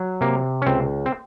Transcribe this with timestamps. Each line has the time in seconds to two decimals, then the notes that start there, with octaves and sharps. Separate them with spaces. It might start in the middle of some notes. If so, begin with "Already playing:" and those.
Already playing: F#3
0.21 C3 A#3
0.62 C#4
0.66 C#2 C4
1.06 C4